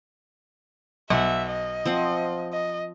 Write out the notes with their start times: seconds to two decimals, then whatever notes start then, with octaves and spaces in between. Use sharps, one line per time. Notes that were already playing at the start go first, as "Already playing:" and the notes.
1.10 B1 E5 F#5
1.51 D#5
1.85 F3 C4 F#5
2.52 D#5